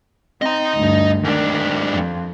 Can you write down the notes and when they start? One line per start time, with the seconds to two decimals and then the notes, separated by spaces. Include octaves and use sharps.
0.42 C4 D#5 A#5
0.75 D2 G2
1.24 G#2 D#3 D4
1.94 F2